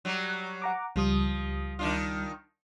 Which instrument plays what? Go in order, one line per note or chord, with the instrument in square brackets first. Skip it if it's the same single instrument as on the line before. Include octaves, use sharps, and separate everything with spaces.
[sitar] F#3 G3
[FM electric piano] F#5 A#5 D6
[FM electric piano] C#2 G3 D#6 [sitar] F3
[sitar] D#3 D4 F4